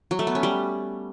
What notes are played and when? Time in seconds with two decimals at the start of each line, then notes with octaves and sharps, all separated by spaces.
0.11 F#3
0.19 A3
0.27 B3
0.35 C#4
0.43 G3